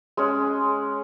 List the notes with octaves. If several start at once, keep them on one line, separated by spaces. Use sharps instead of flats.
G#3 C#4